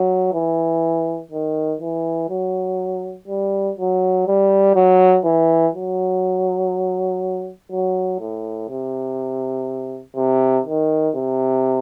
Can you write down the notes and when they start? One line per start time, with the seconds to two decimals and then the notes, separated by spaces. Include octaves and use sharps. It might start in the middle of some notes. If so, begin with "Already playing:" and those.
Already playing: F#3
0.33 E3
1.31 D#3
1.81 E3
2.30 F#3
3.28 G3
3.78 F#3
4.27 G3
4.75 F#3
5.25 E3
5.75 F#3
7.71 F#3
8.20 A2
8.69 C3
10.16 C3
10.66 D#3
11.16 C3